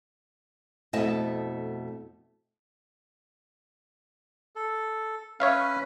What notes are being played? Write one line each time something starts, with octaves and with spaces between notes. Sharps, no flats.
F2 B2 A3 E4 D#5 A5
A4
C#4 B4 C#5 E5 F5